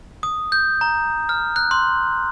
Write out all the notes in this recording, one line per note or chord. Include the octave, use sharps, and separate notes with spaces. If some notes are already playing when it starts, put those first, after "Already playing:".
D#6
G6
A#5
F6
F#6
C6